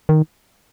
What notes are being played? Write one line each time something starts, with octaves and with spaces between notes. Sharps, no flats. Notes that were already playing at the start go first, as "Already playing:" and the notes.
D#3